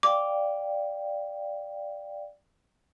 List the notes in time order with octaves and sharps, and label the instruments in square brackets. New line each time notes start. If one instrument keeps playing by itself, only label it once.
[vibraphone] D5 F5 G5 [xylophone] D6